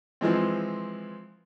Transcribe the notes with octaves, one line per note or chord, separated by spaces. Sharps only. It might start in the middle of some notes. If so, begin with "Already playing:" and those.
E3 F3 G#3 C4